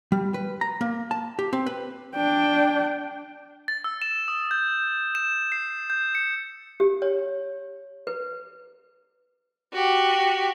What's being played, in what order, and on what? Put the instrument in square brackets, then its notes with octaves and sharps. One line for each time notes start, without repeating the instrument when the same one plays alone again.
[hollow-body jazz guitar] G3
B4
A#5
A#3
A5
G4
C4
B4
[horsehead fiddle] D4 G5
[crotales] A6
E6
E7
D#6
G6
E7
C7
G6
C#7
[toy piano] G4
C#5
B4
[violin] F#4 G4